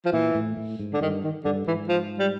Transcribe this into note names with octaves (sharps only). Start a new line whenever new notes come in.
F3
A#2 E3
A2
A2
G#2
D3
G2 D#3
D#3
G2 D3
G#2 E3
F3
G3